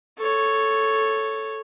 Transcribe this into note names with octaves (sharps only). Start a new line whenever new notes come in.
A4 C#5